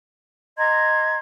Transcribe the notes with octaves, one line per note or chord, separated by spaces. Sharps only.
D#5 A#5 C6 G#6